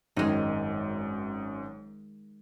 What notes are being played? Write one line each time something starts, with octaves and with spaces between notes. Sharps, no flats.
G#1 F#2 D#3 G#3 D#7